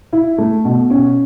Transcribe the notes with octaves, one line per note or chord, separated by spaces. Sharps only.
E4
A3
B2
C#4